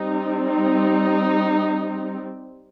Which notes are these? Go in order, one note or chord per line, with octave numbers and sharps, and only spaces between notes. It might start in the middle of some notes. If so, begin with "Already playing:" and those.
Already playing: G3 C4 D#4
D#4